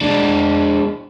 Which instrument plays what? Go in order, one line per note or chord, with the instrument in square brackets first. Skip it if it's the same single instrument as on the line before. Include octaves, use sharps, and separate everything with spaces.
[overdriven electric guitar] G#3 D4